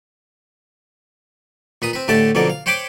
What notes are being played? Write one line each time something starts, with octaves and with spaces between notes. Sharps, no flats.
A#2 B4 D#6
C4 B4
A2 D3 A3 G4 D5 A5
F2 B2 D3 A#3 D5
F5
C5 C#5 G5 B5 C6 D6